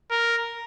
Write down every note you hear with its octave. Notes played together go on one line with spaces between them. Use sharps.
A#4